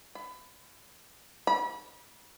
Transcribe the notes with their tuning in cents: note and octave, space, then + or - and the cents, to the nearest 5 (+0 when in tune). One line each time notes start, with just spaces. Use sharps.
B5 +25
B5 -35